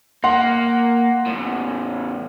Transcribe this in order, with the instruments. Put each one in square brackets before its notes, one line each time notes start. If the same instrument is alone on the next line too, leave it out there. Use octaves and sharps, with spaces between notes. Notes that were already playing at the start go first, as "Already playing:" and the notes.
[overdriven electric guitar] A#3 [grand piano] F#5 C6
[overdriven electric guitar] E2 A2